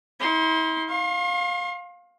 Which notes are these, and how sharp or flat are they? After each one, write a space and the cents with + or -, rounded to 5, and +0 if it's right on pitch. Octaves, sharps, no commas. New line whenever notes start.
E4 -45 C6 +0
F5 +20 C6 +45